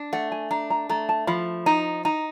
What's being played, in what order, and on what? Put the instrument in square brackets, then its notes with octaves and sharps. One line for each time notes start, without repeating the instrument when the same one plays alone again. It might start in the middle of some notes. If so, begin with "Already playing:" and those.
Already playing: [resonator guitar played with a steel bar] D4
[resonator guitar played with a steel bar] A3 [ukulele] F#5
[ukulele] G#5
[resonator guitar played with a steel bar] D4 [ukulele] A#5
[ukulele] A#5
[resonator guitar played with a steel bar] A3 [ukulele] A#5
[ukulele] A5
[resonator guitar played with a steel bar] F3 [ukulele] B5
[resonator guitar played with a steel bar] D#4 [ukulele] A#5
[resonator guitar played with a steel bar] D#4 [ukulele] A#5